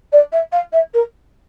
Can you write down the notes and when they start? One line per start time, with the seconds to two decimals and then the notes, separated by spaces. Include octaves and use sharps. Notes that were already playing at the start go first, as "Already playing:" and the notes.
0.12 D5
0.32 E5
0.52 F5
0.72 E5
0.93 A#4